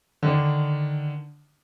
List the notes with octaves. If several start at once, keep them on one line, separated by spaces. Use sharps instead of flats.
D3 D#3 D4